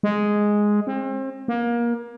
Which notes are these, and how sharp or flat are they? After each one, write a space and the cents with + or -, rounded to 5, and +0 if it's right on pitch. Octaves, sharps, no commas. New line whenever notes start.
G#3 +0
C4 +35
A#3 +25